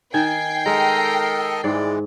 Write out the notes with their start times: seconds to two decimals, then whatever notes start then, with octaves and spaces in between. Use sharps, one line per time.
0.14 D#3 G5 G#5 C7
0.66 G#3 A4 A#4 D#5 A#5
1.64 G#2 E3 G#3 D5